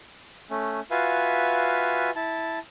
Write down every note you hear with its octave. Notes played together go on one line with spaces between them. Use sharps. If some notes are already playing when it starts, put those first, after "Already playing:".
A3 C#4
F4 F#4 B4 E5 F5 G#5
E4 A5